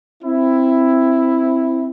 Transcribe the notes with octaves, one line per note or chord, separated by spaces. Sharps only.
C4 E4